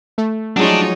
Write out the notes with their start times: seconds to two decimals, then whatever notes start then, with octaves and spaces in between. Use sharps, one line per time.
0.18 A3
0.57 F3 F#3 G#3 D4 D#4 F4 C#5